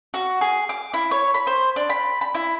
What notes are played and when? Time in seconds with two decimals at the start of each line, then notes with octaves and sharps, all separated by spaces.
0.14 F#4
0.41 G#4
0.69 D6
0.94 E4
1.11 C#5
1.34 B5
1.47 C5
1.76 D4
1.89 B5
2.21 B5
2.35 E4